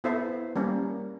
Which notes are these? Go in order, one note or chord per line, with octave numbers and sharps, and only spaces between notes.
B3 E4 A4 C5 E5
G3 A#3 C#4